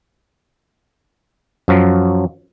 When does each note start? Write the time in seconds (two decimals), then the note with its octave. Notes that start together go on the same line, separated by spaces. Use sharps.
1.68 F#2 F3 F#3